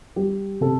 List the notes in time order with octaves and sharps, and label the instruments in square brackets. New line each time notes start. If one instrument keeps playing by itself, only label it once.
[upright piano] G3 G4
C3 A4